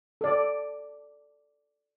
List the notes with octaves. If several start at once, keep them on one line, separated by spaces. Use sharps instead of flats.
A4 D5